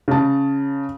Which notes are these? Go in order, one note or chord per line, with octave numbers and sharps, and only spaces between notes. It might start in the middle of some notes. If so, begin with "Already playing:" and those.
C#3 A5